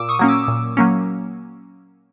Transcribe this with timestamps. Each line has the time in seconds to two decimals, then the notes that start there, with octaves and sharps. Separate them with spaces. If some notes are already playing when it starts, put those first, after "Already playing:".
Already playing: A#2 D6 E6
0.09 C#6 D#6
0.19 F#3 A#3 C#4
0.28 D6 E6
0.48 A#2
0.77 F#3 A#3 C#4